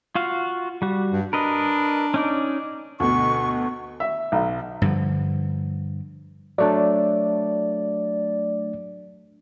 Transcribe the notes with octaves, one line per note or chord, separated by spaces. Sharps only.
F4 F#4 F5
G3 F#4
G2
D4 A#4 B4 D#5
C#4 D#4 D5
D2 B2 C#6
E5
B1
G2 D3 F3
F#3 A3 D4 D5